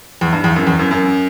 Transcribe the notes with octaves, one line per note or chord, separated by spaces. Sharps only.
E2
G2
E2
F#2
E2
F#2
F#2